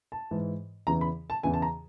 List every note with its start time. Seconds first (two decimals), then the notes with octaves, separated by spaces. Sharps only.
0.12 A5
0.31 G#2 E3
0.87 E2 C#3 E3 A#5
1.01 B5
1.30 A5
1.43 E2 C#3 E3 G#5
1.54 A5
1.62 A#5